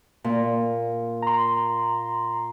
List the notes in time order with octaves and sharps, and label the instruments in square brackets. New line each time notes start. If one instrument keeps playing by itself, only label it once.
[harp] A#2
[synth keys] A#5 C6